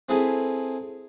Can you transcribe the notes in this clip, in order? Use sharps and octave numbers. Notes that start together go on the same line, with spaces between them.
C4 E4 G#4 A4 B4 A#5